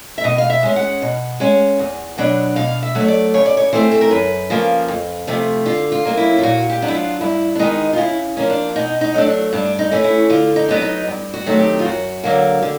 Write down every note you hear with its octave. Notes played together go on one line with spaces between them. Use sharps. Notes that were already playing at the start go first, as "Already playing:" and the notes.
E5
B2 D#5
F5
E5
G#3 C#4
F#5
B2
G#3 C#4
E2
B2 F#3 B3 D4
B2 F5
E5
F#3 A3
C#5
D5
C#3 C#5
D5
C#5
E3 A3 C4 C5
A4
A#4
F#2 B4
C#3 F3 A#3
F2
C3 F3 A3
D3 F4
F4
F#3 A#3 C#4
E4
F4
A#2 F#4
G4
F#3 B3 D4
E4
F4
G2 E4
D4
D#3 G#3 B3 D#4
F4
C#3 E4
F3 A#3 C#4
D4
B2 D#4
D#4
F#3 A3 D4
D4
G2 D4
D#4
E3 A3 C#4
E4
D3 F4
D#4
F#3 B3 D4
D#4
G2
F#4
D#3 F#3 A3 C4
G4
F4
F#2 F#4
D3 F#3 A#3
D3